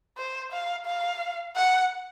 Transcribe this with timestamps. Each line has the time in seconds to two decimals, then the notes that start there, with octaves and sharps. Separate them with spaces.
0.18 C5
0.52 F5
0.86 F5
1.56 F#5